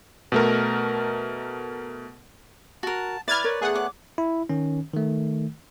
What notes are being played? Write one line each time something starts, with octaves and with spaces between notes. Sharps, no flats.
B2 A3 A#4
F#4 A#4 A5
E4 B4 D5 E5 B5 F6 G#6 A6
A#4 B4 C#5
A3 B3 G#4 F#5 F#6
C#5 D6
E4
D#3 C#4
D#3 A3